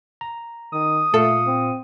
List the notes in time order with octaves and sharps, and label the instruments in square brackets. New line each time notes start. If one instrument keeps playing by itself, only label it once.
[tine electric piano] A#5
[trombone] D#3 [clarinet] D#6
[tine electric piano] A#2 F5 C#7 [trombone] A3 [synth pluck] A4
[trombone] C4